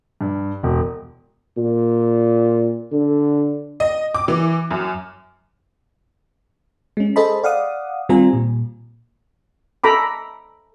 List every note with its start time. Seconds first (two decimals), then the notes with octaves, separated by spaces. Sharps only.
0.21 G2
0.63 E1
1.57 A#2
2.92 D3
3.80 D#5
4.15 D6
4.28 E3
4.71 F#2
6.97 G#3 C#4
7.16 G#4 A4 C5 D#5 A5 B5
7.43 D5 F5 F#5 D#6
8.09 D#3 G3 C4 F4 G#5 A#5
8.33 A#2
9.84 A4 A#5 B5 D6